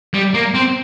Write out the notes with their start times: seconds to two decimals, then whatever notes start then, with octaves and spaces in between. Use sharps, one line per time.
0.14 G3
0.34 A#3
0.54 C4